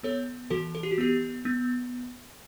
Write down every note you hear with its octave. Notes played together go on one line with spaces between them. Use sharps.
B3 A4 C#5
E3 F#4 A4
A4
G4
F#4
B3 G4
B3